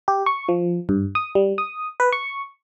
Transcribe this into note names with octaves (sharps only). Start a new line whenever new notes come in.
G4
C#6
F3
G2
D#6
G3
D#6
B4
C#6